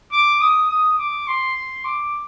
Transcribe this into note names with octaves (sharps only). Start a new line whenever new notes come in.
D6
D#6
D#6
D6
C6
D6